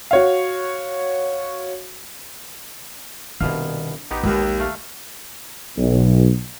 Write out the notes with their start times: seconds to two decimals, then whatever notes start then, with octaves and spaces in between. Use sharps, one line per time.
0.11 F#4 C#5 F5
3.41 C2 B2 D#3 D4 F5
4.11 A1 B3 D#4 G4
4.23 A#1 D#2 G#3
4.60 A3 F5
5.77 B1